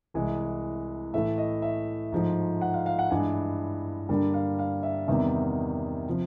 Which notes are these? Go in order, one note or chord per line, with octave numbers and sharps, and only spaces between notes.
C2 C3 E3 G#3 G#5
A2 E3 A3 E5
D#5
E5
G#2 F3 A3
F#5
F5
F5
F#5
G2 E3 G#3 G#5
G2 D3 G3 A#3
F5
F5
E5
E2 C3 D#3 G3 B3 E5
C3 F3